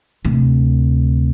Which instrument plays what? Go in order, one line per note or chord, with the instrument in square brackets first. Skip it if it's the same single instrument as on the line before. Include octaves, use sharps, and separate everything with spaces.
[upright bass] D2 C3